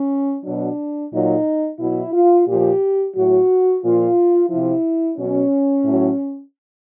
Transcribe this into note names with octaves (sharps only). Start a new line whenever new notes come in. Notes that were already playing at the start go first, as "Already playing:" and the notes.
Already playing: C#4
B2 F#3 D4
A#2 F#3 D#4
B2 F#3 E4
F4
A#2 G4
F3
A2 F#3 F#4
A#2 F3 F4
C3 F3 E4
B2 F#3 C#4
A2 F#3